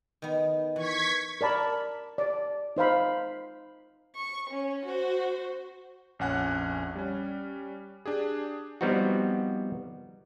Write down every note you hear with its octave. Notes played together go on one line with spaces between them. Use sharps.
D#3 B3
E3 C#6 G#6 B6
A#4 D5 A5 B5
D5
D#4 C5 F5 B5
C#6
C#4
F#4 C5
A#1 F2 C#4 F#5 G#5 F#6
G3 C#4
D4 G4 G#4
F3 G3 B3 C4 D#4 F#4